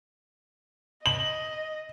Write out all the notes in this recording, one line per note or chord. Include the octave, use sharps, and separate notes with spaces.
D#5 F#7